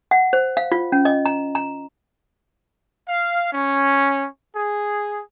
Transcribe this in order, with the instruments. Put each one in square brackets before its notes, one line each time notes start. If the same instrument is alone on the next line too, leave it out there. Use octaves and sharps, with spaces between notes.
[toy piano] F#5
C5
F5
F4
C#4
D#5
A#5
A#5
[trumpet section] F5
C#4
G#4